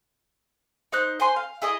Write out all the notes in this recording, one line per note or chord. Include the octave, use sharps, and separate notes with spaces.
D#4 C5 F#6
C5 G#5 C6
F5
E4 G#4 D#5 D#6